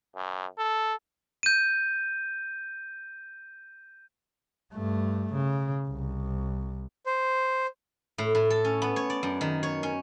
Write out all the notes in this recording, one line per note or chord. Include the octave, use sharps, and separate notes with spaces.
F#2
A4
G6 D#7
G2 A3
C#3
C2
C5
A2
A2
A4
C#4
B3
C#5
D5
F#2
D#3
C#5
C#4